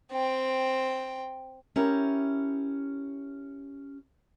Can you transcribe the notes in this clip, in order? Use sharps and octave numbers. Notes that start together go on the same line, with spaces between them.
C4 G5
C#4 E4 G4 A#4